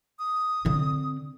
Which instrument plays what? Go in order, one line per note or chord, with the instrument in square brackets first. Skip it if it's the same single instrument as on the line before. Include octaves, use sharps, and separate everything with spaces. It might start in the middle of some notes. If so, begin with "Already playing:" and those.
[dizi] D#6
[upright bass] D3 C4